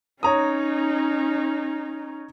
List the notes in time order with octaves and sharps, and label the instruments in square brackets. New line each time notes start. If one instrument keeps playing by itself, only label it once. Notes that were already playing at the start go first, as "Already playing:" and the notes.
[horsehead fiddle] C#4 D#4 [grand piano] C#5 A#5 D#6